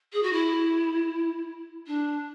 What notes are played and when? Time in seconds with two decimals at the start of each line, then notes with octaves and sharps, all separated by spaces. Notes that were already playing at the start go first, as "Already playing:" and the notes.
0.12 G#4
0.22 F#4
0.32 E4
1.86 D4